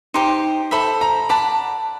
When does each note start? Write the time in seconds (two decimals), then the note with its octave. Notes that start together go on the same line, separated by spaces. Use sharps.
0.14 D#4 G4 C5 C6
0.71 A4 C5 E5 B5
1.01 A#5
1.29 D5 F#5 A5 B5